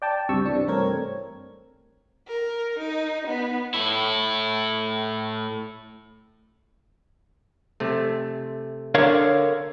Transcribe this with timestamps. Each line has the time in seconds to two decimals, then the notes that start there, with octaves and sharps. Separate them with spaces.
0.02 D5 G5 A5
0.29 C#2 G2 C3 C#6 E6
0.45 C3 E3 D4
0.67 G2 A3 C4 A#4 C#5 G#6
2.28 A#4
2.79 D#4
3.27 B3
3.74 A2 E4
7.80 C3 A3
8.95 D3 A#4 C#5 F5